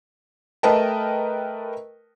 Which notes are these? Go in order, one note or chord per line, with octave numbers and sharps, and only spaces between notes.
A3 A#4 B4 D#5 G5 A5